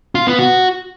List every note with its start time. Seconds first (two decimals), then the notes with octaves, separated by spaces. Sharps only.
0.15 F4
0.27 B3
0.39 F#4